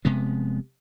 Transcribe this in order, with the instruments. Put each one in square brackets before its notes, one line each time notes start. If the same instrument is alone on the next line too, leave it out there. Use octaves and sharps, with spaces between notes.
[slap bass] F1 C3 G#3 B3